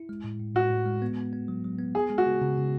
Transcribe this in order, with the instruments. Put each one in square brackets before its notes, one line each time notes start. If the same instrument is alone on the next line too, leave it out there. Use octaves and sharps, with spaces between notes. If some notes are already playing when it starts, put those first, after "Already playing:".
Already playing: [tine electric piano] E4
G#3
A2
A2
[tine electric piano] A2 [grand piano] F#4
[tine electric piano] A2
G#3
B3
B3
B3
F#3
F#3
B3
[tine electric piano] B3 [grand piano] G#4
[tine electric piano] G#3
[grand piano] F#4
[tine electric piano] C#3
C#3
C#3